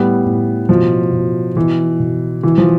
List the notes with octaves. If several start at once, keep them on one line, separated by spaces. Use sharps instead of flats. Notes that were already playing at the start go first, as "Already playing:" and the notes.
Already playing: A2 G3 B3
A2
B2 F3
B2
B2 E3
B2
B2 E3
F3